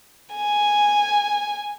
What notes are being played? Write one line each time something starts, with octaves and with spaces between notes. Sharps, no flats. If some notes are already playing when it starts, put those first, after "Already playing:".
G#5